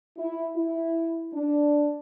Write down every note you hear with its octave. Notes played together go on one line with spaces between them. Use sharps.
E4
E4
D4